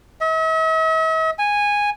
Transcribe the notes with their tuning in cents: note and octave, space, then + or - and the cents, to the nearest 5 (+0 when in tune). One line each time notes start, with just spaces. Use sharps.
E5 -45
G#5 -10